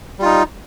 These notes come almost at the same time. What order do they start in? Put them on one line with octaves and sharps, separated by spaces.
G3 F4 D#4